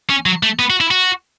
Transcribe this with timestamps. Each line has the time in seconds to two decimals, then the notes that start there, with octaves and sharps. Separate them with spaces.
0.10 C#4
0.26 F#3
0.43 A3
0.59 B3
0.70 F#4
0.81 E4
0.91 F#4